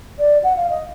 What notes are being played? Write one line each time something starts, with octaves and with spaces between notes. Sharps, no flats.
D5
F#5
F5
D#5